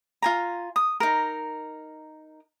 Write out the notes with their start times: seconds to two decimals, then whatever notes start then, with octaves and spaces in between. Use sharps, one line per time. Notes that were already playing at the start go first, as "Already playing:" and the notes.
0.22 F4 G#5 A#5
0.76 D#6
1.00 D#4 A#4